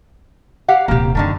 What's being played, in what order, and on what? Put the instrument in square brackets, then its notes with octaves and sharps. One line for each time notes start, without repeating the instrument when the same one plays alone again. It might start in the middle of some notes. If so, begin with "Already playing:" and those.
[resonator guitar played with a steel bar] G4 F5 F#5
[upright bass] D#1 C3 [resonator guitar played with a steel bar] A#3 G4
[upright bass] F#2 [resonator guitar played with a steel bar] D3 D#3 A3